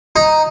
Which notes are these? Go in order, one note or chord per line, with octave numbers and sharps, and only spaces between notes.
D#4